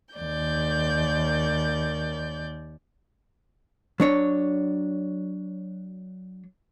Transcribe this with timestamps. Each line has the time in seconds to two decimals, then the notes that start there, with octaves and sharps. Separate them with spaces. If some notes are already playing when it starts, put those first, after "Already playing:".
0.15 D#2 D5 G6
4.00 F#3 D4 C#5